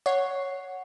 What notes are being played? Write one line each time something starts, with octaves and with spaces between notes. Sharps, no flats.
C#5 F#5 C7